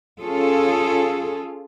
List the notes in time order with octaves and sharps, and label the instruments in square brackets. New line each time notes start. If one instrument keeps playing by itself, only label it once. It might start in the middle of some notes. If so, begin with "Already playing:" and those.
[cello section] C#4 F4 G#4 A4